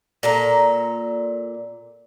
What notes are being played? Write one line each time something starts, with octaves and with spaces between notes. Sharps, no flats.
A#2 A4 A#5